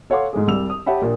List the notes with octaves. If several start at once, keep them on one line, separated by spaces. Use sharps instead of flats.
A4 C#5 F5 F#5 C6 D6
G#2 G#3 A3 G#4
C2 G3 E6 F7
D#6
G4 C#5 E5 F#5 A5 B5
A#1 A#2